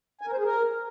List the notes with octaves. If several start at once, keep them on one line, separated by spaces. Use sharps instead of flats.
G#5
A#4
C5
G#4
A#4